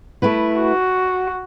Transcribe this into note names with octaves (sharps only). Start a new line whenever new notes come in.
A3 E4 B4
F#4